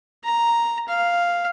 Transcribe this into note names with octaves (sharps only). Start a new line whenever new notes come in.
A#5
F5